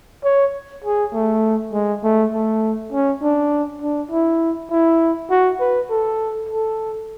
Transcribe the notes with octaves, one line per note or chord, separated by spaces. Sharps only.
C#5
G#4
A3
G#3
A3
A3
C#4
D4
D4
E4
E4
F#4
B4
A4
A4